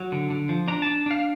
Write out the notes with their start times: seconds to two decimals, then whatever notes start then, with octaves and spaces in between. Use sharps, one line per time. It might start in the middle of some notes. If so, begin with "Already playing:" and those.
Already playing: F#3
0.12 D3
0.30 D3
0.49 F3
0.68 D4 A#5
0.82 D4 A5
1.06 D4 F5